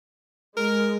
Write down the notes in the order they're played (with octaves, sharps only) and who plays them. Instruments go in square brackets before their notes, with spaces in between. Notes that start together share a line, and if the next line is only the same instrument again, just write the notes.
[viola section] G#3 [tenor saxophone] A#4